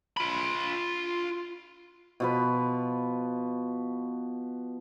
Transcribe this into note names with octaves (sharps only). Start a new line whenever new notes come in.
F4 B5
B2 F3 B4